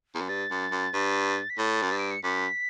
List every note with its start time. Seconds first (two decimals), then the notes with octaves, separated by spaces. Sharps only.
0.15 E2
0.21 F#2
0.29 G2 A6
0.51 F#2
0.71 F#2
0.94 G2
1.50 B6
1.58 A2 A6
1.82 F#2
1.91 G2
1.99 D7
2.11 C#7
2.23 F#2 B6